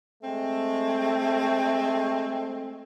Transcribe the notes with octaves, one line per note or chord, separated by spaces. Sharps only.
G#3 A3 C4